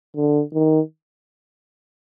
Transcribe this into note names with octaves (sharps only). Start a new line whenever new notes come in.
D3
D#3